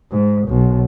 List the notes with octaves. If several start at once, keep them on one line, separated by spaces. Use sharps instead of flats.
G#2
B1